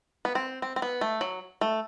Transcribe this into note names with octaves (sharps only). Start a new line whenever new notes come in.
B3
C4
C4
C4
B3
A3
F#3
A3